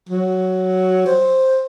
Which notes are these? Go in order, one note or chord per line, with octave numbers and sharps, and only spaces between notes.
F#3
C5